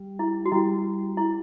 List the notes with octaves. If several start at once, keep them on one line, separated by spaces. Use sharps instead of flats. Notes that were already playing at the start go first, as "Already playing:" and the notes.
Already playing: G3
E4
F#4
G3 E4
E4